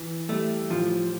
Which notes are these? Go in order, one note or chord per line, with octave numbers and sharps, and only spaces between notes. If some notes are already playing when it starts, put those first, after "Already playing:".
Already playing: E3
G3 A3
A2 F3